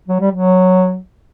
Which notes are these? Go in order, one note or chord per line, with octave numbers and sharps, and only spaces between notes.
F#3
G3
F#3